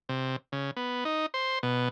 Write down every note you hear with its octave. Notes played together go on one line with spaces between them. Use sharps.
C3
C#3
B3
D#4
C5
B2